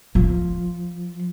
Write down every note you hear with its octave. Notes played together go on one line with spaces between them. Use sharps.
F3